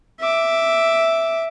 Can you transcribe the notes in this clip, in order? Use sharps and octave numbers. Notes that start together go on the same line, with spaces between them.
E5 D6